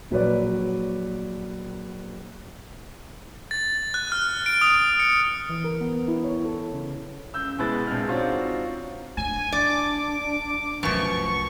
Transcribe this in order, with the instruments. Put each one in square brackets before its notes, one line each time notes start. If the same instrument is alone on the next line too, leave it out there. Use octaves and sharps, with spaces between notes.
[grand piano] A#1 F#3 B4 C#5 D5
[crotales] A6
F#6
F6
D7
D#6
C#7
[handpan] E3
A#4
B3
E4
C#5
A4
C#3
[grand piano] C#2 E6 G6
B2 G#3 E4 B4 A6
A#1 C3 G#3 F6
C4 D4 D#4 F4 F#4 C#5
[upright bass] D1 D4 [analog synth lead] G#5
[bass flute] D4 [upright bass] E4 [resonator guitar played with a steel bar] D5 [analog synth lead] D6
[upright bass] C2 A2 [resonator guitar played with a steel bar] F#2 F3 [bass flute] B4 [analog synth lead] C#6